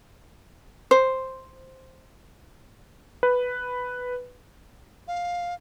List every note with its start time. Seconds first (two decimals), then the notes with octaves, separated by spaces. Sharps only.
0.91 C5
3.23 B4
5.08 F5